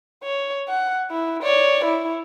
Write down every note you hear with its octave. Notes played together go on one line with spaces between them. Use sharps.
C#5
F#5
E4
C#5 D5
E4